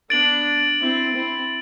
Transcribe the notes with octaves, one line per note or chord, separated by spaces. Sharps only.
B3 D4 A6 D7 F#7
C4 E4
C4 E4